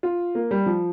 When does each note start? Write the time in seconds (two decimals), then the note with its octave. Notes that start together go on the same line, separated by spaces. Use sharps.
0.03 F4
0.35 A#3
0.51 G3
0.66 F3